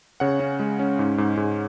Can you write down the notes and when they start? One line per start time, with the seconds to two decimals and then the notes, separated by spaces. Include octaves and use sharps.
0.20 C#3 C#5 F#5
0.40 C#4
0.60 G#3
0.79 C#4
0.99 G#2
1.18 G#2
1.37 G#2